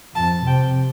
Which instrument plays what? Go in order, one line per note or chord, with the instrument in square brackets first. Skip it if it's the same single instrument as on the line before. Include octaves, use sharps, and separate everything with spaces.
[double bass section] F2 [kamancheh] A5
[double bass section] C3 [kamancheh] G5